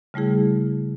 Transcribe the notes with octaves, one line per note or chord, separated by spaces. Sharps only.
C#3 G3 A3 E4 G#4